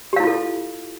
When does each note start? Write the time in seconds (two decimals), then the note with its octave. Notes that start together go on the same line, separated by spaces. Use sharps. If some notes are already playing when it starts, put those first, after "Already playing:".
0.13 G4
0.16 F5
0.20 E4
0.24 F4
0.27 A4